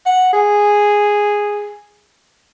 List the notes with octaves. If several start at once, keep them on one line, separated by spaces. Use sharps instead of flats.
F#5
G#4